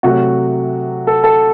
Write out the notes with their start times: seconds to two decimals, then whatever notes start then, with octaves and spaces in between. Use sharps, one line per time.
0.03 C3 F#3 A3 F#4
1.07 A4
1.24 A4